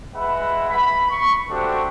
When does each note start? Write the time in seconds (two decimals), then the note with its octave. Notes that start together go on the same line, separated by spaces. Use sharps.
0.14 G#3 B4 E5 F#5 B5
0.70 B5
1.10 C#6
1.49 A3 C4 D4 F#4 G4